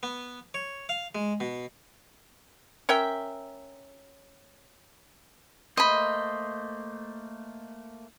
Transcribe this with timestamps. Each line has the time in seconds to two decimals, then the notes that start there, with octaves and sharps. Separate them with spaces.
0.03 B3
0.54 C#5
0.89 F5
1.15 G#3
1.40 B2
2.89 C#4 A#4 E5 G5
5.77 A3 A#3 C5 D#5 B5